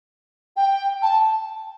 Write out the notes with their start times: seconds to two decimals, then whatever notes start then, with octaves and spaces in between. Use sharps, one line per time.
0.56 G5
1.02 A5